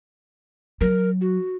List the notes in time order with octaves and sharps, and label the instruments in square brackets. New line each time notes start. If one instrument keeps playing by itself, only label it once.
[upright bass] F#3 [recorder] A#4
[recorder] F#4